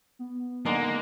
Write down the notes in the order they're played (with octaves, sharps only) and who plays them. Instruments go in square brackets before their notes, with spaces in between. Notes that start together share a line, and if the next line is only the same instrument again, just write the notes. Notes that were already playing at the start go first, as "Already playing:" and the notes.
[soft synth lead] B3
[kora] D3 G#3 D4 [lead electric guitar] A#3 [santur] D#4